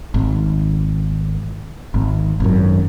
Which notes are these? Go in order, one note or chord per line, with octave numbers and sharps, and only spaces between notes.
G#1
G#1
G#1 F#2